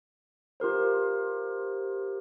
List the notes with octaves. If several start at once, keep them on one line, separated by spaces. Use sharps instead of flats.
F4 G4 A#4 C5